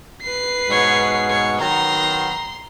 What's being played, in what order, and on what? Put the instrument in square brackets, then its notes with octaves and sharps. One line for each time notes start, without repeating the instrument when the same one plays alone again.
[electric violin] B4 C7
[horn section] G#2 B2 F#5 [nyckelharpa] C#5
[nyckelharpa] C#5
[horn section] D#3 F#3 B3 [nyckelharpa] A#5 [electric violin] C6